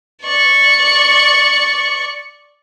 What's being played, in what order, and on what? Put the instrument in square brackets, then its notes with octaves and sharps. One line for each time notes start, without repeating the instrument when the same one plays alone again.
[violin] D5 C#6